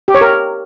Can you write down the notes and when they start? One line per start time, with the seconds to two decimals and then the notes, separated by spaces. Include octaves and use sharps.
0.08 G4
0.15 C#5
0.21 A#4